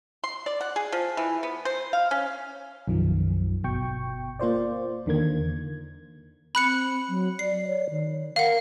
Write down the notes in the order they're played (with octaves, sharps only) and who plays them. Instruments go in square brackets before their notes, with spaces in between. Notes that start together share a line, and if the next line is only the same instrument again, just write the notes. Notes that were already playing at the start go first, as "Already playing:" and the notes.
[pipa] C6
D5
F#5
G#4
F3
E3
B3
C5
F5
C#4
[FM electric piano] B1 F#2 D#3 F3
G1 B2 G5 C#6
A#3 F4 C5 D5
E2 D3 D#3 A#3 G#6
[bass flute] C4 [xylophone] B5 F#6 C#7
[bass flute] F#3
[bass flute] D5 [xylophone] C7
[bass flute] C#5
D#3
[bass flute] A#4 [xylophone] F5 F#5